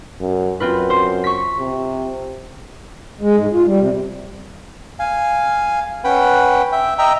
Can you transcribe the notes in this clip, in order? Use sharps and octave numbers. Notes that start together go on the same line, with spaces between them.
F#2
F#2 C4 F4 B4
C5
C#6 B6
C3
G#3
G#2
F4
G3
C3
F5 G#5
C#4 B4 F#5 G5 B5
E5 G5
D#5 E5 G5 A#5